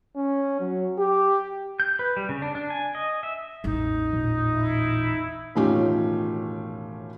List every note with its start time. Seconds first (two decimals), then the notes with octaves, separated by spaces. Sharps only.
0.16 C#4
0.60 F#3
0.98 G4
1.80 G6
1.99 B4
2.17 G3
2.29 C#3
2.42 D4
2.55 D4
2.70 G#5
2.95 D#5
3.23 E5
3.64 A1 E2 D#4
4.13 A#2
4.55 E4
5.55 E1 A2 D#3 C#4 F4 G4